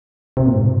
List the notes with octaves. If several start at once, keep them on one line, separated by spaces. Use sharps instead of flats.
C3
A#2
G#2